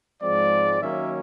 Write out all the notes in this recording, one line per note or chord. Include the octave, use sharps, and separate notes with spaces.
G#2 F3 G#3 C4 D5
D#3 F#3 A#3 C#4 E5